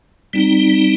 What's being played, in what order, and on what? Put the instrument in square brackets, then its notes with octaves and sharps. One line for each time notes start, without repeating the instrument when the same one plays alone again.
[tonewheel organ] G3 C4 D#4